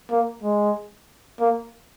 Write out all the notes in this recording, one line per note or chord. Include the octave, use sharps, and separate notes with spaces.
A#3
G#3
A#3